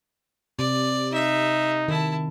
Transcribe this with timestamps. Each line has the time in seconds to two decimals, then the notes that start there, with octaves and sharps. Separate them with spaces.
0.59 C3 D5
1.14 D#4 E5
1.88 D#3 E4 A5